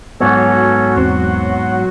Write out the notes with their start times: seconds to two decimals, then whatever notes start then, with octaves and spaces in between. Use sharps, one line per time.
0.21 G#2 F#3 B3 C#4 F#4 A4 C#5
0.97 E2 C4 F#5 C6